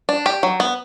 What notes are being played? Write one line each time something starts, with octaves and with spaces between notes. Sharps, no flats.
D4
G4
F#3
B3